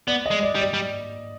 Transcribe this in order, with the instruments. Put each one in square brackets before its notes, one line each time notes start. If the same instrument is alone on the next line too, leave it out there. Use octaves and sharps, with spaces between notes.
[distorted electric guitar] B3 [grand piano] D5
[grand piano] D#5
[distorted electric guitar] G#3
[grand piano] D5
[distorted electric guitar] G3
[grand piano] D5
[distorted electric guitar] G3